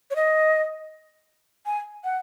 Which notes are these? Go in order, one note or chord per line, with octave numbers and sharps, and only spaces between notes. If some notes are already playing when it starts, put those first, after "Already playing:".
C#5
D#5
G#5
F#5